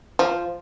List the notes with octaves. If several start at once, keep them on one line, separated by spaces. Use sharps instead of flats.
F3